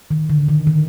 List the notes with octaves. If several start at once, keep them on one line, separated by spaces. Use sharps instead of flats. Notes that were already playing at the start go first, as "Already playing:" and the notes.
D#3
D3
D#3
D#3